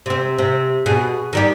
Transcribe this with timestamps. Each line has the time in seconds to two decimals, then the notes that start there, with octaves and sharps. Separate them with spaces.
0.06 C3 C4
0.38 C3
0.86 B2 G#4
1.33 D#3 G3 G4